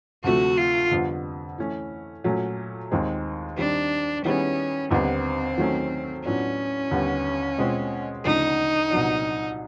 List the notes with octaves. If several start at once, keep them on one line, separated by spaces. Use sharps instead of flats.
D2 C3 F3 A3 F#4
F4
F2 D3 G3 B3
E3 A3 C#4
A#2 F#3 A3 C#4
D#2 D#3 G#3 C4
D#3 G3 C4 D4
D#3 G3 B3 C#4 E4 G#4
D#2 D3 G3 B3 C4 D#4
D#3 F#3 A3 C#4
A2 F#3 B3 C#4 D4 F4
D#2 D3 G3 B3
B2 G#3 C4 F4
D2 C#3 F3 A3 D4 D#4
C2 A#2 F#3 B3 D4